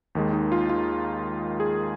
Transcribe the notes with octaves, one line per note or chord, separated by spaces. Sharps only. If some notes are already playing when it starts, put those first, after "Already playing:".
D#2 D#3 G#3
D#4
F4
F4
G#4